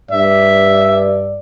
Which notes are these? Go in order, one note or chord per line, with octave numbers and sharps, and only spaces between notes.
G2 D5 E5